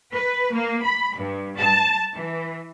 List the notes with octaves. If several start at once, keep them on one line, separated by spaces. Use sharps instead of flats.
B4
A#3
B5
G2
A5
E3